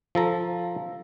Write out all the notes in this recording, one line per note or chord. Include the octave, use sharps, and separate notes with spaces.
F3 A4 A#5